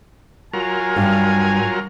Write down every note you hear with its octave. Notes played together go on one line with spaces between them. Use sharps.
F#3 F4 A#4 G#5
G2